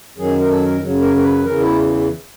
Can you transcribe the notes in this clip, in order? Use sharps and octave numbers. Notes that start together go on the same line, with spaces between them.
F#2 D#3 F#3 G#4
A#4
A4
A#4
F#2 C#3 F#3
A#4
A#4
B4
E2 C#3 E3 A#4
E4